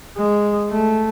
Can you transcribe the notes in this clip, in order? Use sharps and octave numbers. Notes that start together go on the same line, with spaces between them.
G#3
A3